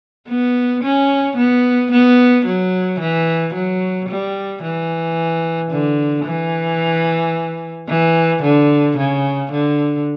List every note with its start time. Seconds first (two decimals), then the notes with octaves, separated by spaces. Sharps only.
0.28 B3
0.83 C#4
1.37 B3
1.91 B3
2.45 F#3
3.00 E3
3.54 F#3
4.09 G3
4.63 E3
5.71 D3
6.25 E3
7.88 E3
8.42 D3
8.97 C#3
9.51 D3